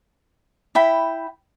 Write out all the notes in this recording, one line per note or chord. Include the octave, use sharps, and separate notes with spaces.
E4 G5 B5